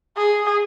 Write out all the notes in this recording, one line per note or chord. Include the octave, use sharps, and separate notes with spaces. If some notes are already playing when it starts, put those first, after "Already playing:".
G#4